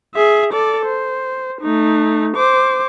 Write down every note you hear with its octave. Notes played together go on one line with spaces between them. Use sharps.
G#4 E5
A4 D5
C5
A3 D#4
C5 D6